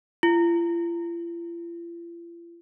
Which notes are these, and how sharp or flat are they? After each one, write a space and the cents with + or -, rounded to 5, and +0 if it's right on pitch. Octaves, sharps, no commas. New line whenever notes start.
F4 -45